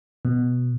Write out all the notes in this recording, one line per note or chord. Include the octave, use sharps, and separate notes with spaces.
B2